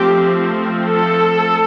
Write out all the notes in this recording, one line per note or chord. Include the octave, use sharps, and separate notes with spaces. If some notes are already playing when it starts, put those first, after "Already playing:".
Already playing: F3 A3 C4 G4
A4